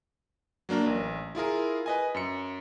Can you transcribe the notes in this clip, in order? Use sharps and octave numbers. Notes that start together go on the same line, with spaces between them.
F#3 A#3 D4 A#4
A1
E4 F4 G#4 A#4
B4 D#5 G#5
F#2 C#7